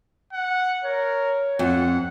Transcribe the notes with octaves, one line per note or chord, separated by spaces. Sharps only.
F#5
A#4 C#5
F2 F#5